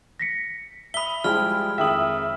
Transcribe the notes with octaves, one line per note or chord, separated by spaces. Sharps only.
A#6 B6 C#7
E5 B5 D#6 B6 G7
F3 G3 G#3 E4 G4 F6
F2 D#3 G#3 E5 G5 D#6 F#7